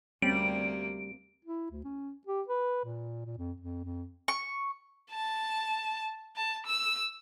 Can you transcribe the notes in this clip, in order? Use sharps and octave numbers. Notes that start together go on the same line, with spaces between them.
D2 C3 G3 A#3 C4 C#4 D7
E4
D2
C#4
G4
B4
A#2
A#2
F2
F2
F2
C#6
A5
A5
E6